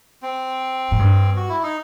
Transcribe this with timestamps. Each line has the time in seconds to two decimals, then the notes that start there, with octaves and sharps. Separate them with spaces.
0.22 C4
0.91 A2
0.99 G2
1.36 F#4
1.49 E4
1.63 D#4